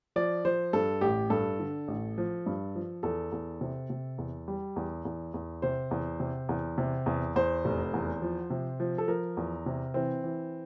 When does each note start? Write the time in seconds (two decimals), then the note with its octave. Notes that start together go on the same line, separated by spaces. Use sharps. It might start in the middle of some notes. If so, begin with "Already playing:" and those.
0.16 F3 D5
0.45 F3 C5
0.73 G2 A4
1.01 A1 G4
1.30 G2 A4
1.60 D3
1.88 A1
2.18 F3
2.46 G2
2.75 F3
3.03 E2 A4
3.32 E2
3.61 C3
3.90 C3
4.18 E2
4.48 G3
4.76 E2
5.05 E2
5.34 E2
5.62 C3 C5
5.91 E2
6.20 C3
6.49 E2
6.78 C3
7.06 E2
7.36 E2 C5
7.65 F1
7.94 E2
8.22 F3
8.50 C3
8.80 F3
8.98 A4
9.08 F3 A#4
9.37 E2
9.66 C3
9.94 E3 C4
10.24 E3